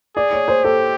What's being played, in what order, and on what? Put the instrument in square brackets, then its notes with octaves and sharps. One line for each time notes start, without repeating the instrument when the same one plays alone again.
[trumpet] G#4 [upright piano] D5
[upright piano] C#5
C5
[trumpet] G4 [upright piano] A4